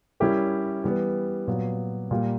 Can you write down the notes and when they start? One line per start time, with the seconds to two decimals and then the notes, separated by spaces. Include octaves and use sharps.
0.20 G3 C#4 E4 G4 A#4
0.84 E3 G3 B3
1.48 A#2 F#3 B3
2.11 A#2 G3 A#3